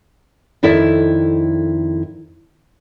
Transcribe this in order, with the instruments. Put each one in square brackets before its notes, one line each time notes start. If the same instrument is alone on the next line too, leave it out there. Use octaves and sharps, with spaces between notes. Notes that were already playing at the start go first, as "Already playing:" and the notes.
[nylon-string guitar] F2 D#3 E4 A4 D5 E5